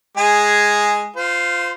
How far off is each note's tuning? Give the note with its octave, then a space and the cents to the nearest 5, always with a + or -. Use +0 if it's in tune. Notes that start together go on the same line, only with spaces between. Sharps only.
G#3 +0 G#4 +0
F4 +0 C5 -25